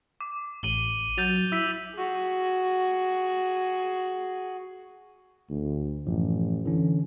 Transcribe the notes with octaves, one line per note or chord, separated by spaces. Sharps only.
D6
A1 D#7 F#7 G7
F#3 G6 A6 F7
E4 E6 B6
F#4 G#4
D2
A1 F#2 F3
D3 E3 C#4